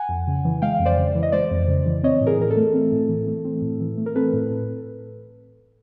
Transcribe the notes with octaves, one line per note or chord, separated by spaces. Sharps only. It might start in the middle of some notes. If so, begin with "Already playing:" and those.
Already playing: F#5 G#5
F2
C#3
E3
G#3 F5 G5
F2
C5 D5
C#3
E3
D#5
G#3 C5 D5
F2
C#3
E3
C4 C#5 D#5
A2
G#4 A#4
E3 A#4
A4
A3
C4
A2
E3
A3
C4
A2
E3
A3
A#4
C4 A4 B4
A2